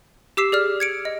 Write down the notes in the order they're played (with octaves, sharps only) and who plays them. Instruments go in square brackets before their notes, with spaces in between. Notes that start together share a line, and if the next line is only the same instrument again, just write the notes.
[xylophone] G4 D6 E6 B6 C7 E7
G#4 D5 F6
G#6 C#7 D7
D#5